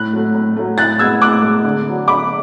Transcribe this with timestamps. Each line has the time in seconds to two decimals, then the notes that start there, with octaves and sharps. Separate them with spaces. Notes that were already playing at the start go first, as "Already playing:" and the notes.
Already playing: A2 F#6
0.13 F#3 A3
0.35 A2
0.56 F#3 A3
0.78 A2 F#6 A6
0.99 G#3 B3 E6 G#6
1.21 A2 D6 F#6
1.42 G#3 B3
1.64 D3
1.86 F#3 B3
2.08 D3 B5 D6